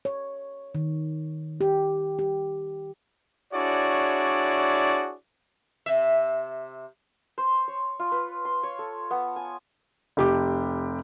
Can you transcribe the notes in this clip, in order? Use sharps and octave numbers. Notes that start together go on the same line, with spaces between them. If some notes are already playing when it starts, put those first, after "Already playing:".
C#5
D#3
G4
G4
D4 E4 F#4 G#4 C#5 D5
C3 E5
C5
C#5
F4
B4
C6
C#5
A4
B3
G#5
F1 G4 D6